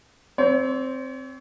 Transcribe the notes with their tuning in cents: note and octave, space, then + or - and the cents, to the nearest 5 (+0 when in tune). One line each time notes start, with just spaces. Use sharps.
C4 +0 C#5 +40